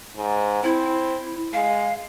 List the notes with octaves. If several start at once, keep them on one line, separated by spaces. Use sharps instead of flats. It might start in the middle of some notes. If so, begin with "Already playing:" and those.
G#2
C4 E4
G#3 F5